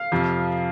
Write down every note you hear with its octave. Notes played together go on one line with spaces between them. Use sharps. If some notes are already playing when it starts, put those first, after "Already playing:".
Already playing: F5
F2 C3 F3